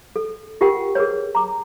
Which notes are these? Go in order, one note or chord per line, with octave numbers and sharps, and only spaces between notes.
A4
F4 G4 A#4 F#5 G5
G#4 A#4 B4 C#5
A#5 D6